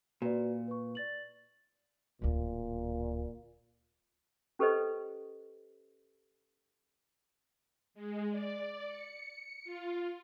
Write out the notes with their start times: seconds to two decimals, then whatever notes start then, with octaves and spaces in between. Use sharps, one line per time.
0.22 A#2 F#4 B4 D5
0.68 B4 C#6
0.95 D5 A6 F#7
2.22 D1 D2 A#2
4.59 C#4 G4 A4 B4 C5 D#5
7.94 G#3
8.31 D5
8.87 C#7
9.64 F4